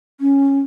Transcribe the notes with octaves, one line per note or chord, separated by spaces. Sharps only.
C#4